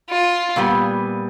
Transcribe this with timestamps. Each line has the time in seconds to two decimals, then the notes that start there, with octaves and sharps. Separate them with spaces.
0.10 F4
0.56 A#2 G3 B3